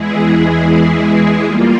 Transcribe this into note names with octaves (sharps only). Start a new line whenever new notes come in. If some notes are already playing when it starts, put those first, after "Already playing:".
Already playing: E2 E3 G#3 E4 G#4
G3 A#3 F4